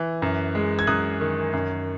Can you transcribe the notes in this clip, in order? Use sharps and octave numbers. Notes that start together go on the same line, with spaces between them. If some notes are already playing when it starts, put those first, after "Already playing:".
Already playing: E3
F#2
G#3
G#6
F#2 D#6 F#6
D#3
F#2